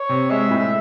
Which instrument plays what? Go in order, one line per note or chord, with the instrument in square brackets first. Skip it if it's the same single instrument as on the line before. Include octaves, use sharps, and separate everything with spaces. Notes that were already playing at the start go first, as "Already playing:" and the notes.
Already playing: [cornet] C#5
[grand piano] C3
[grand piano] G#3 [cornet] E5
[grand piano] A2